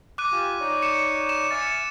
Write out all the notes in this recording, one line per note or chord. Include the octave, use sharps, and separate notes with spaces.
D6 F#6 D#7
F4 G4 G#5
D#4 C#5 D5
C#7 E7
E7
E5 G#5 F6 A6 C#7